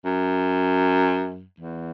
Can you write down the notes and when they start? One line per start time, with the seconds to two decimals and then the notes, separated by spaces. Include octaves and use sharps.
0.05 F#2
1.60 E2